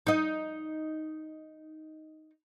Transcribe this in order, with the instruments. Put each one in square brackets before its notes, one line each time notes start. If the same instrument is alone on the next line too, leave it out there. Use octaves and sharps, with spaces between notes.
[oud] D#4 D#5